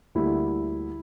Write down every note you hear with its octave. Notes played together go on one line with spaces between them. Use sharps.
D2 D3 G3 A#3 E4